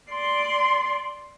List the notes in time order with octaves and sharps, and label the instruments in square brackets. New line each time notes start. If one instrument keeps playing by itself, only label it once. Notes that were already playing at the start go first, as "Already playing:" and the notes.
[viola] D5 C6